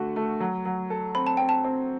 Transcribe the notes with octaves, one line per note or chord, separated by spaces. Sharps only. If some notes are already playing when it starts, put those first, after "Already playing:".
Already playing: D3 A3 D4 F#4
A3
F#3
F#3
A4
C4 B5
A5
C4 G5
A5
C4